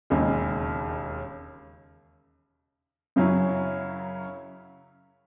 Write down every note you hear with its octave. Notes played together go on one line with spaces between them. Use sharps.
E1 D#2 C#3 G#3
F#2 C#3 F#3 C#4 E4